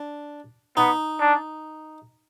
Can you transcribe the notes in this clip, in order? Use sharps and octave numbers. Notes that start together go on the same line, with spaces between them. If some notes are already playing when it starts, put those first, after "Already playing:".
Already playing: D4
B3 D#4
D4